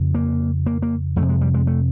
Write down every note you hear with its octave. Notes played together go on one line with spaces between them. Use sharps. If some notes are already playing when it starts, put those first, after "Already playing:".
Already playing: F2 C#3
A#3
A#3
A#3
F2 C3 A3
G#3
G3
G#3
A3